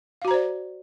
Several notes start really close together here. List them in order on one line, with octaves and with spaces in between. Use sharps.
F5 F#4 A#5 C5 D5